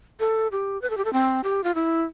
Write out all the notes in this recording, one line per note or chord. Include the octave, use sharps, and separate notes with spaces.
A4
G4
B4
A4
G4
A4
C4
G4
F4
E4